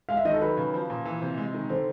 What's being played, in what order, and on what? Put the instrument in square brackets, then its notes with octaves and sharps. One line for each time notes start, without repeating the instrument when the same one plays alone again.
[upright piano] G#3 [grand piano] F5
[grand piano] E5
[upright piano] D#3 [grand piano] D#5
[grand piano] A4
[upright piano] F#3 [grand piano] B4
[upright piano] C#3
F3
A#2
E3
C3
G#3
D#3
[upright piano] D3 [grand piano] C5